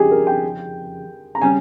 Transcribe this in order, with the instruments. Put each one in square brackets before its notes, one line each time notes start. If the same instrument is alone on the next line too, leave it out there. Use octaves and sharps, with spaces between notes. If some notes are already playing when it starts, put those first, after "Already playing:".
Already playing: [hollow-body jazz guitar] F2 C#3 F3 D#4 [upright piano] G4 G#4
[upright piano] A#4
G5
A#5
[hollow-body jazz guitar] C#3 G3 C#4 [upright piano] G#5